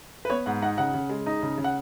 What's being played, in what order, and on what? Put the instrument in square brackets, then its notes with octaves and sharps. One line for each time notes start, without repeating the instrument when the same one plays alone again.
[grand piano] B4
B3 C#5
G#2 F#5
D#4 F#5
C#3 F#5
C#3
G#3
D#4
C#3
C#3
F#5